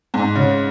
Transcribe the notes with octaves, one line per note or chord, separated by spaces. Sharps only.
G#2
C#3